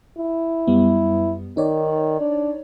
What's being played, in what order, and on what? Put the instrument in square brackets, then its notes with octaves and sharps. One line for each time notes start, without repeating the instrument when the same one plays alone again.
[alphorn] E4
[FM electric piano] F#2 G3 B3
[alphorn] D#3 [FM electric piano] D#4 C#5 D5
[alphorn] D4